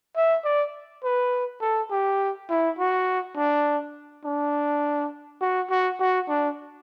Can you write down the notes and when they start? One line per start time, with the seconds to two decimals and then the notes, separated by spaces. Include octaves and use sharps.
0.16 E5
0.45 D5
1.04 B4
1.61 A4
1.91 G4
2.50 E4
2.79 F#4
3.37 D4
4.25 D4
5.41 F#4
5.70 F#4
5.99 F#4
6.29 D4